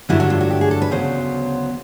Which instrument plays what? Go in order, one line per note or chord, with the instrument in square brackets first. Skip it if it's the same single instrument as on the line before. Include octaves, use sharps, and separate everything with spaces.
[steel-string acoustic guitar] G2 D3 F#3 A3 D4 E4
F#4
F4
F#4
G4
G#4
A4
B4
D2 C#3 F#3 B3 C5